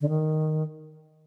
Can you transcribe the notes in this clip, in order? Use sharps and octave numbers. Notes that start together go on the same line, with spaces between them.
D3
D#3